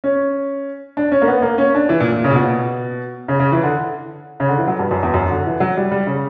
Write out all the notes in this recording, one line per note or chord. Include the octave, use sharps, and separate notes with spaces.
C#4
D4
C#4
A#3
B3
A#3
C#4
D4
E3
A#2
A#2
C#3
A#2
B2
C#3
C#3
E3
D3
C#3
D3
E3
F#3
G2
F#2
E2
F#2
D3
E3
F#3
G3
G3
C#3